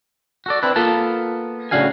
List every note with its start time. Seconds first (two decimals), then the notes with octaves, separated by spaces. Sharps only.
0.46 F#4 A4 D5
0.63 C4 D4 E4 B4
0.76 A#3 B3 F4 A4 A#4 A5
1.71 A2 C#3 D4 F#4 F5 G#5